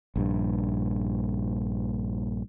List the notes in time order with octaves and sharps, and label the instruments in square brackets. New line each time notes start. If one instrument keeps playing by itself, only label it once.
[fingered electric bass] A#1 G2